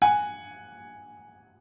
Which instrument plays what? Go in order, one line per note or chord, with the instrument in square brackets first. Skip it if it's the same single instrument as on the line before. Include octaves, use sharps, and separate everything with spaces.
[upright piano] F#5 G#5